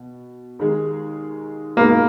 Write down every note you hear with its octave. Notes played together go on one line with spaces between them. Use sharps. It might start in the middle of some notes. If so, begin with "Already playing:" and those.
Already playing: B2
D#2 D#3 G#3 D#4 G#4
C#2 B2 G#3 A#3 D#4 G#4